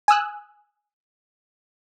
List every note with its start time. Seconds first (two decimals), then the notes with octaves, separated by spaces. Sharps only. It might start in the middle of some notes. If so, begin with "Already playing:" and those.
0.08 G#5 D#6 E6 F#6